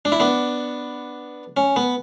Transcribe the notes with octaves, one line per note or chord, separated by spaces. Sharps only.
D4
E4
B3 D4
C#4
B3